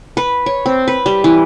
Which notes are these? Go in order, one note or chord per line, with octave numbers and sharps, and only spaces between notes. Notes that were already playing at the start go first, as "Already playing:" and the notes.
B4
C#5
C4
B4
G3
E3